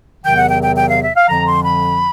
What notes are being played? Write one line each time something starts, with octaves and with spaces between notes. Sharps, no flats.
E2 C3 D#3 F#3 G5
F#5
G5
G5
G5
F5
E5
F5
F2 D3 F3 A#5
C6
B5